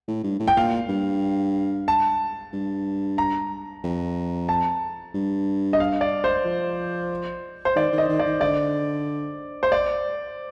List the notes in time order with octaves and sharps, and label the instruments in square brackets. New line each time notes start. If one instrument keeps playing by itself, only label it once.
[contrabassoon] A2
G2
A2
[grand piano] G5
[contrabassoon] A#2 [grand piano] F5
[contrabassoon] G2
[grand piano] A5
[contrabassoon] G2
[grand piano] A#5
[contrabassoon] F2
[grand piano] A5
[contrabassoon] G2
[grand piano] D#5
F5
D5
C5
[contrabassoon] F3
[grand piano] C5
[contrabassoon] D#3 [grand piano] D5
[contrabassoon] D#3
[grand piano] D#5
[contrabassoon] D#3
[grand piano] D5
[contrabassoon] D#3
[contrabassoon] D3 [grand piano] D5
[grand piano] C5
D5